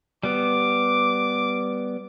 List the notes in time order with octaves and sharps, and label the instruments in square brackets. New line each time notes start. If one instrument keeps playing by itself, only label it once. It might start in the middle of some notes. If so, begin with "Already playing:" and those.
[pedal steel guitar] G3 B3 [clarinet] D6